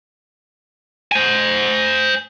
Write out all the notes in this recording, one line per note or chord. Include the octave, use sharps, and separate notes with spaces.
C5 G#5